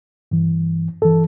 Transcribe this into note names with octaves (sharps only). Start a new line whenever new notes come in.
G2 E3
G2 E3 A4